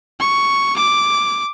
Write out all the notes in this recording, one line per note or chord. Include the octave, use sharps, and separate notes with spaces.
C#6
D6